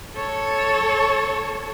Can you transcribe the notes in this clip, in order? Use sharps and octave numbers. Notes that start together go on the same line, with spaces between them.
A4 C#5